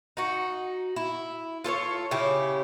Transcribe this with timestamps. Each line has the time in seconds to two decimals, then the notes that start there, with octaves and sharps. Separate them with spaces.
0.17 D#4 F#4
0.96 E4
1.64 F4 A4 C5 C#5
2.11 C#3 E4 G4